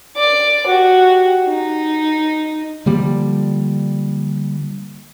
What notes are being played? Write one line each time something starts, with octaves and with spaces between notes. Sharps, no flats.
D5 D6
F#4 G4
D#4
D3 F3 G3 A#3